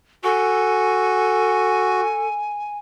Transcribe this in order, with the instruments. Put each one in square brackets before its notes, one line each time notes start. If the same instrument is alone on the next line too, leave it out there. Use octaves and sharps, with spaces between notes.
[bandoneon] F#4 [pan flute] A4 [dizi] G#5